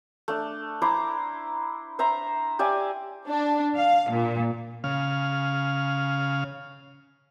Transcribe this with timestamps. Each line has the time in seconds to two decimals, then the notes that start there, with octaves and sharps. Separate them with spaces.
0.28 A3 D4
0.82 E4 C5 A#5 D6
1.99 C5 E5 A#5
2.59 G4 D5 E5 G#5
3.29 D4
3.76 F5
4.12 A#2
4.84 C#3 F5